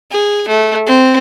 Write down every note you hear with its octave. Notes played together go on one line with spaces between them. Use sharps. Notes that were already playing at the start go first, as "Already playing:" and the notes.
G#4
A3
C4